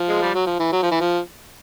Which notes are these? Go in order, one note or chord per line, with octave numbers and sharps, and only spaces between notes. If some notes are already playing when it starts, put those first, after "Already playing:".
Already playing: F3
G#3
G3
F#3
F3
E3
F#3
F3
E3
F3